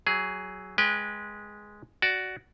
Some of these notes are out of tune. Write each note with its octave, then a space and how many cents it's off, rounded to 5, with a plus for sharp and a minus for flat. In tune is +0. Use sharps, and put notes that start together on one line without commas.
F#3 +15 G#4 +0
G#3 +0 B4 -20 G5 +15
F#4 +10 D5 +0